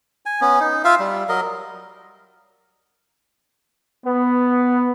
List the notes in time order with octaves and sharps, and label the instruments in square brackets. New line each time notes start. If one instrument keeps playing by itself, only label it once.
[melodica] G#5
B3 C#4
D#4
F4 E5 F5
G3
F#3 A#4 D#5
[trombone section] B3